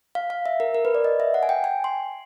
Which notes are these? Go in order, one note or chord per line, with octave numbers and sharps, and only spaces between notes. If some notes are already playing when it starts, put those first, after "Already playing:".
F5
F5
E5
A#4
A#4
B4
D5
D#5
E5
F#5
G#5
G5
G#5
C6